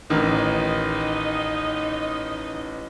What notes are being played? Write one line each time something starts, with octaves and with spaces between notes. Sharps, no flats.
A1 D#3 D#4